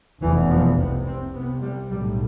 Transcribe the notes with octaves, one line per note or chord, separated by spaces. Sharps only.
F1 E2 B2 E3
F3
C2 C3 B3
C4
C2 C3 B3
G3
B1 A2 G3